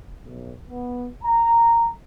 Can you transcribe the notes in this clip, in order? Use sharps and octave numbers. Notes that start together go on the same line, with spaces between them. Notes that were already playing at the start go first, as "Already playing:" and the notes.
B1
B3
A#5